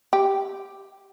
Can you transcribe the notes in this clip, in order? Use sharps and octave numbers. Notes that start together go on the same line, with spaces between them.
G4